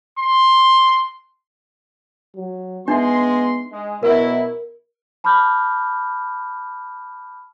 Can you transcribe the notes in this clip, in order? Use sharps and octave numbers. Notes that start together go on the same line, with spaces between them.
C6
F#3
G#3 B3 D4 D#4 E5 C6
G#3
B2 F#3 E4 A#4
A5 B5 D6 F6 G6